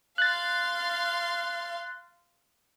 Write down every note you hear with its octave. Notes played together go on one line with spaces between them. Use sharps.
F5 C6 F#6 A6